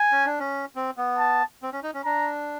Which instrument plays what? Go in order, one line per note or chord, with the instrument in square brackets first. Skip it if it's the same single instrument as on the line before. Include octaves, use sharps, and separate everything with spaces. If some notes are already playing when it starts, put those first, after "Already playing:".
Already playing: [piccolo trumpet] G#5
[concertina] C#4
D4
C#4
C4
B3
[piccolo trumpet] A5
[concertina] C4
C#4
D#4
C#4
[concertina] D4 [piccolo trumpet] A#5